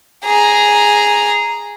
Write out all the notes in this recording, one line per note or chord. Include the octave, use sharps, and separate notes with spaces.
G#4 A#5